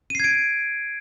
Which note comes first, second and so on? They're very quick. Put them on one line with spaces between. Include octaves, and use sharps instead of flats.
D#7 C7 G#6 D7